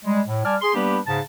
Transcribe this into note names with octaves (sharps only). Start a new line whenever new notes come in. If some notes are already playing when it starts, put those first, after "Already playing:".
G3 G#3
A2
G3 D5 G#5 A5 F6
G#4 C6
G3 A#3 B3 D4 G4 B4
G#2 C#3 A5